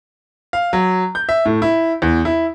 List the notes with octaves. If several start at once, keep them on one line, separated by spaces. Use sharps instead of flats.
F5
F#3
G6
E5
A2
E4
E2
E4